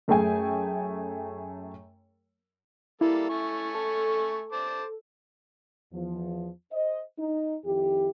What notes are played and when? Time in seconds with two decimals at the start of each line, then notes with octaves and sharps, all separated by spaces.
0.08 F#2 A3 G#4 G5 G#5
3.01 G3 A#3 E4 A4
3.30 A3 G#5 C#6
3.75 A4
4.52 C5 A5 D6
5.92 E2 F3
6.72 C5 D#5
7.19 D#4
7.65 F2 D#3 E4 G4